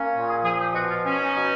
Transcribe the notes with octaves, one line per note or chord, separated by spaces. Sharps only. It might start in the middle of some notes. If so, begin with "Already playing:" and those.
Already playing: A#3 C#4
A#2
G#4
F3 G#4
G4
B2 F#4
F4
C#4
D#4
B2